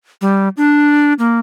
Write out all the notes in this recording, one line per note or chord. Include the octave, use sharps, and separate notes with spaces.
G3
D4
A#3